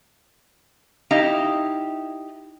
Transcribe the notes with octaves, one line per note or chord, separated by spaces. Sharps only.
D#4 E4 G4 F5